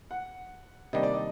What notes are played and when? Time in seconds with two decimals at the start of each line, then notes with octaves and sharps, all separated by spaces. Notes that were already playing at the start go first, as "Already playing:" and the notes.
0.11 F#5
0.93 C3 D#3 G3 A#3 D4 D#5
1.03 D5
1.14 D#5